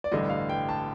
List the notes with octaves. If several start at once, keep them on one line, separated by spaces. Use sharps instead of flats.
D5
A1 G2 D3 D#5
F5
G5
A5